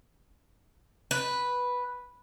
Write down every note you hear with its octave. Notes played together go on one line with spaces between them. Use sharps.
B4